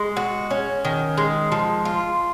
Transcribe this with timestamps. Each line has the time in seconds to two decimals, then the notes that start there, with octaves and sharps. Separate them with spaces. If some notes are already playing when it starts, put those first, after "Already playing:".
Already playing: G#3
0.17 F#4
0.50 C#4
0.85 D#3
1.18 G#3
1.52 F3
1.85 F4